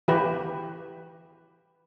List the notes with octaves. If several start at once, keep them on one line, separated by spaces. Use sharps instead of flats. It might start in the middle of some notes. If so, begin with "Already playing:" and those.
E3 G4 B4